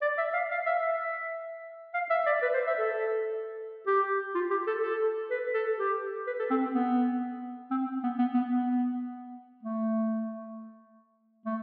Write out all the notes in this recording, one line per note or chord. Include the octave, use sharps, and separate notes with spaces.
D5
E5
F5
F5
E5
E5
F5
E5
D5
B4
C5
E5
A4
G4
F4
G4
A4
A4
B4
A4
G4
B4
A4
C4
B3
C4
B3
B3
B3
B3
A3
A3